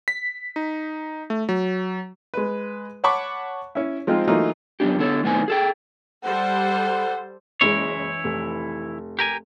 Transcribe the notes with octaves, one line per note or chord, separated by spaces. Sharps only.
B6
D#4
A3
F#3
G#3 B4
C#5 F#5 A5 B5 C#6 D6
C#4 E4
F3 G#3 C4 D#4 F4
E3 F#3 A3 A#3 D#4 F4
F#2 A#2 B3 D4 G4
D3 B3 A4 C#5
F#2 A2 D#3 B3 C4 G#5
G#4 A4 G5
G3 A4 C5 F#5
F#1 E3 G#3 E4 C#5
F1
G4 A#4 G#5